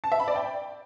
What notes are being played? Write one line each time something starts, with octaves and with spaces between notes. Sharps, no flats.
A5
E5
B5
D5
G5